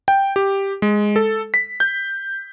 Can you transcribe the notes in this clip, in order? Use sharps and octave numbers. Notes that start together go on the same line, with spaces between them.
G5
G4
G#3
A4
B6
G6